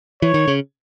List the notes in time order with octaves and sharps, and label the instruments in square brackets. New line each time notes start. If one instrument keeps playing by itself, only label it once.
[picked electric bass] E3 [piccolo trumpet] C#5
[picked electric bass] D#3
C#3